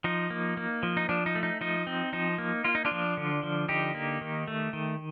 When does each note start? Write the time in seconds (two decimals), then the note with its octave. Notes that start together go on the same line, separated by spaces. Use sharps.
0.04 F3 D#4
0.30 A#3
0.57 A#3
0.83 F3
0.97 D#4
1.09 F3 D4
1.26 D#4
1.35 A3
1.43 D#4
1.61 F3 D#4
1.87 C4
2.13 F3 D#4
2.38 A#3
2.64 A#3 F4
2.75 D#4
2.85 D4 F4
2.91 F3
3.17 D3
3.43 F3
3.69 D3 D#4 G4
3.95 A#3
4.21 D#3
4.48 A3
4.73 D#3